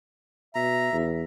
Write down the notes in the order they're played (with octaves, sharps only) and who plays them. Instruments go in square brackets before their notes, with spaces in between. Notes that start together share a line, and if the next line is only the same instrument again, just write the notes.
[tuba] B2 [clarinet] E5 [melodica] A#5
[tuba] E2